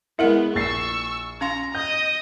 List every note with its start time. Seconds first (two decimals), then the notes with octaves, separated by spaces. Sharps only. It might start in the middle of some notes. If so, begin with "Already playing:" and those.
0.19 G#3 B3 E4 A#4 E5 F#5
0.55 A#1 C#6 E6 A6 C7
1.41 C#4 F5 A#5 C6
1.75 D#5 D#6 G6